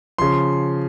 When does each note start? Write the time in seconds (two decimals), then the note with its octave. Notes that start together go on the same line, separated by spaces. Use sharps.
0.18 C#3 F3 C6